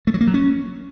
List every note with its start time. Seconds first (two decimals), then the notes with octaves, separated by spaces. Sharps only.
0.07 A3
0.14 F#3
0.21 A#3
0.27 F#3
0.34 C#4